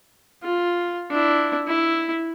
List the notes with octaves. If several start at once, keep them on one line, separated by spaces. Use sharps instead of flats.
F4
D4 E4
E4